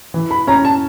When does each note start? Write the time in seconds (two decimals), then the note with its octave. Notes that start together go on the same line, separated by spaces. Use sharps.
0.14 E3
0.31 B5
0.47 C#4 A#5
0.65 A5